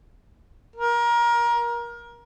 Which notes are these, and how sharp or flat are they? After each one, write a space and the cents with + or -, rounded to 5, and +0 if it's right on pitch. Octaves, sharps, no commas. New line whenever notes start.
A#4 +25